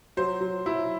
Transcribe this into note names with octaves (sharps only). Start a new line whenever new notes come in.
F#3 C5
F#3
F#3 E4